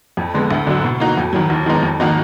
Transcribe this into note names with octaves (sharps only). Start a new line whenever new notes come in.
F2
D3 G#3 B3
D2
D3 F#3 D4
B2
A#3 D#4 F#4
F2
D#3 F#3
D#2
D#3 G#3 B3 D#4
F2
D#3 A#3 D#4 F#4